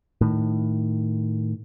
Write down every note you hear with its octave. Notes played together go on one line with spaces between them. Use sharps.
A2 D#3